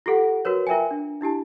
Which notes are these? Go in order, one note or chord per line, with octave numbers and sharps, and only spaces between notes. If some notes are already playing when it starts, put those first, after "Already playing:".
F4 G4 A4 F#5
F#4 A#4 B4 C#5
F4 A#4 E5 G5 G#5
D4
D4 E4 G4 A5